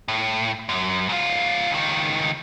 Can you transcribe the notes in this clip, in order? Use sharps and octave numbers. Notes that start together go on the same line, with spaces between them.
A2
F#2
G#2 F4
C#2 D#3